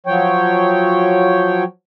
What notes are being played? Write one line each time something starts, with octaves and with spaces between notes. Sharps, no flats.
F3 F#3 C#5 G5